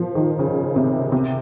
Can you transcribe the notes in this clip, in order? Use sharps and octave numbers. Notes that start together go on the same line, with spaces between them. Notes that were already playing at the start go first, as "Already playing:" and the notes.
Already playing: F3
D#3
C#3
C3
C3